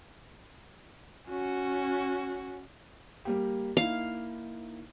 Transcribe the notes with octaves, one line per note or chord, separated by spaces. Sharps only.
C#4 F#4
G3 A#3 G4
A#3 D#4 E4 F5